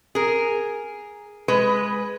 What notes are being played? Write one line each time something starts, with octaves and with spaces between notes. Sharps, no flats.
G#4 A#4
G#3 B4